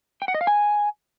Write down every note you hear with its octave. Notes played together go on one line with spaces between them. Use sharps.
G5
F#5
D#5
F5
G#5